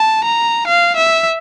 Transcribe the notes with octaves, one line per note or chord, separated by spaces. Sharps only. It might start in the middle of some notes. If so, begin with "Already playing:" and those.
Already playing: A5
A#5
F5
E5